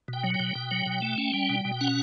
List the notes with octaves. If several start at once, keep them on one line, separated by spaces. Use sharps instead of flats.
B2
G5
F#3
G5
B2
B2
F#3
B2
A3
C#4
G3
B2
B2
C#4 F#5